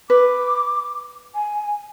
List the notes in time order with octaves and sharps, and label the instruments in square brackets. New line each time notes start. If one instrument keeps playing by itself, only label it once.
[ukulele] B4 [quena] D6
[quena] G#5